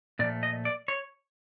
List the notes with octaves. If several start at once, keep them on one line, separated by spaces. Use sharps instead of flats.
A#2 F3 A3 D5
D#5
D5
C#5